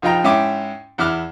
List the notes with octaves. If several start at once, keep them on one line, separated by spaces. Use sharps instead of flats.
A#1 F3 D#4 F4 G5 A#5
G#2 C#4 E4 E5 G5 D6
E2 E4 D6 F6 F#6